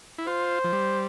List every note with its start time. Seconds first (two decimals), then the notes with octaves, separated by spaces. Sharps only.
0.18 E4
0.27 F4 C5
0.64 F3
0.73 G3